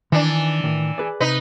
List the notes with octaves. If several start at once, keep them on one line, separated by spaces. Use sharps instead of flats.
D#3 E3 D4
A2 D#3
G#4 B4 D5
C3 D#4 B4